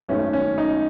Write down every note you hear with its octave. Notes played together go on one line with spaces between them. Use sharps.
G#1 F#2 D#3 A3 C#4
C#4
D#4